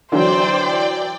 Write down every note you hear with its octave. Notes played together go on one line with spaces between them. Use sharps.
D3 E3 F#3 C5 D5 G5